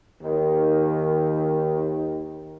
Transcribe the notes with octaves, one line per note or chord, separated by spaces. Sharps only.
D#2 D#3